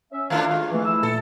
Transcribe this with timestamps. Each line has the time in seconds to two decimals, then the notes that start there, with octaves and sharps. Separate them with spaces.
0.12 C#4 E5
0.30 D2 D#3 A3 D4 F4 F5 A5 F6
0.51 G#3
0.71 E3 F3 A3
0.85 E4 E6
1.03 A#2 A4